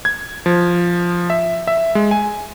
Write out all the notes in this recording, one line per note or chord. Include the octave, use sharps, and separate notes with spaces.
G#6
F3
E5
E5
G#3
G#5